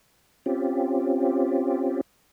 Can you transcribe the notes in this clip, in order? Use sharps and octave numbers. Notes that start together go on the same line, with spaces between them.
C4 C#4 F4 G4